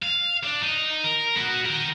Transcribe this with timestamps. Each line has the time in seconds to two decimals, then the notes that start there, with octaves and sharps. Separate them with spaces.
0.03 F5
0.44 D4
0.63 D#4
1.04 A#4
1.37 B3 F#4
1.65 A#4 G5